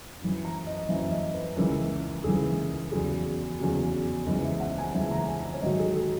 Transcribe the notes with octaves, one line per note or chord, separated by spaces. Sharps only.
F#2 E3
A#5
D#5
F#2 E3 E5
D#5
B4
C#2 C#3 E3 A#4
C#2 C#3 E3 G#4
E2 C#3 F#3 G#4
E2 C#3 F#3
C#2 C#3 E3 D#5
E5
F#5
G#5
C#2 C#3 E3 E5
A#5
G#5
E5
C#5
G#2 D#3 F#3 D#5
G#4
G#4